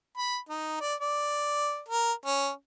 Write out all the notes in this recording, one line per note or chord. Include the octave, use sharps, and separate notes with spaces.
B5
D#4
D5
D5
A#4
C#4